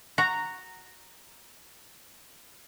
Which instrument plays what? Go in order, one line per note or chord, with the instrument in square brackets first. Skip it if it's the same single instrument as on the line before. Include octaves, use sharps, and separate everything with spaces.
[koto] F#4 [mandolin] A#5